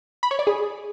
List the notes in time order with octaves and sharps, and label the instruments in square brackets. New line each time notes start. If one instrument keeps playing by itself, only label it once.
[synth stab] B5
C#5
D5
G#4